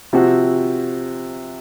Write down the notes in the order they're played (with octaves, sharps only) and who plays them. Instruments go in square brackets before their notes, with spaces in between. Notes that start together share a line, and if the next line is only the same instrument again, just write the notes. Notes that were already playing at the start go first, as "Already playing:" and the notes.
[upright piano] C3 F3 C4 F#4